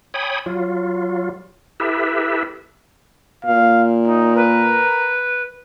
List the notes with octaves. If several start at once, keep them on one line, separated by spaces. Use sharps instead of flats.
C#5 G5 G#5 B5 D#6
F#3 F4
E4 G4 A4 B4 E5
A#2 F5
D#4
A#4 B4